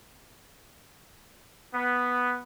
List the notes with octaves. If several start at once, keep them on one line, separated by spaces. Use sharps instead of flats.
B3